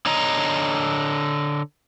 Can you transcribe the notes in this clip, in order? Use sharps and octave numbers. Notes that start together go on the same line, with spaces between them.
D3 C#5 D#5 A#5